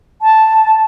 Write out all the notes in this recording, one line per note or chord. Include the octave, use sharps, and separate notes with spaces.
A5